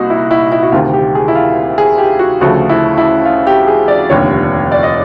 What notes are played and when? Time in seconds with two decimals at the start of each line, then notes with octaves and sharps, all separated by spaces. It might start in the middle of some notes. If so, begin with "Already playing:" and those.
Already playing: C2 A#2 D#4 F#4
0.10 E4
0.31 E4
0.52 E4
0.63 F#4
0.72 D2 C3 D#3 F4
0.93 G4
1.15 G#4
1.28 E4
1.35 F4
1.78 G#4
1.98 G4
2.19 F#4
2.41 D2 C#3 F3 A3 F#4
2.69 E4
2.98 E4
3.25 F4
3.47 G4
3.67 G#4
3.88 D5
4.10 F1 D#2 D3 G3 C#5
4.72 D5
4.83 D#5